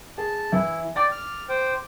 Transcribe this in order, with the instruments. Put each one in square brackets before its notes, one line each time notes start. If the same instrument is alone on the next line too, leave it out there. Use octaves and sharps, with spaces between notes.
[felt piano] G#4 [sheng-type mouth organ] A5
[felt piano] E3 [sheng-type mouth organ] E4
[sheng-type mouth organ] D5 G5 [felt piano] D6 A6
[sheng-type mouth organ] F6
C5 G5